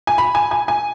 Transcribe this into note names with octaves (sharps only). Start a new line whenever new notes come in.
G#5
B5
G#5
G#5
G#5